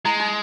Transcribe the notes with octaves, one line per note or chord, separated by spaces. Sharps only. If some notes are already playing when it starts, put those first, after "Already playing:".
G#3 E4
D#4